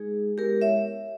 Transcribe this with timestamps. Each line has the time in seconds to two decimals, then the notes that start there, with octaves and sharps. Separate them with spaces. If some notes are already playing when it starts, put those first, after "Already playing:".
Already playing: G#3 D#4 G#4
0.38 G#3 B3 E4 G4 A#4
0.61 C#5 E5